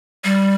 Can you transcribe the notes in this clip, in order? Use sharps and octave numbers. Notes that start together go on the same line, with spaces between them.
G3